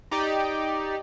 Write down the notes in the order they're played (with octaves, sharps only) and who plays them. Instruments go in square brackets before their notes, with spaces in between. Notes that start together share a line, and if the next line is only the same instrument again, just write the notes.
[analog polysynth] D#4 G4 D5